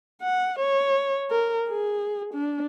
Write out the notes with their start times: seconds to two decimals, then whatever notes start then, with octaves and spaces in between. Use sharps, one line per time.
0.22 F#5
0.59 C#5
1.31 A#4
1.69 G#4
2.34 D4